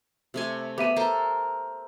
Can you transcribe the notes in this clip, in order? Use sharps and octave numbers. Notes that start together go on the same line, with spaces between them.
C3 A3 G#5
B3 G4 E5 D#7
A4 A#4 C5